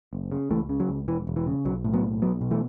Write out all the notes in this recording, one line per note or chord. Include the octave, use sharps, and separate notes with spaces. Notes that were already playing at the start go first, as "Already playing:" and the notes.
F#1
C#3
C#2 E3 A3
C#3
F#3
C#2
E1 E3
E1
E3
C#3
B1 F#3
A2
F#3 B3
B1
B1 F#3 B3
B2
E3 A3